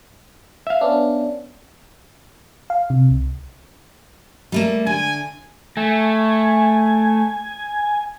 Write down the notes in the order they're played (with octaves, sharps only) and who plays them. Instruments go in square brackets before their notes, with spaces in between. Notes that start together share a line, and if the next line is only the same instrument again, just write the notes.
[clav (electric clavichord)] E5 F5
[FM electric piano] B3 C#4 D4
F5
C3
C2
[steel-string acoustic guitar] G3 A3 A#3
[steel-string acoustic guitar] D3 [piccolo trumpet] G#5
[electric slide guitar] A3 [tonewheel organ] G#5